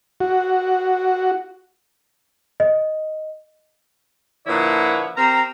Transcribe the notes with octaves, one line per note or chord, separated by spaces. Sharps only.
F#4
D#5
A#2 D3 F3 E4 B4 C#5
C4 G4 A#4 A#5